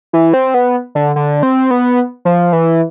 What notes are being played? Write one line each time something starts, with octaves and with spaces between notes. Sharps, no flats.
E3
C4
B3
D3
D3
C4
B3
F3
E3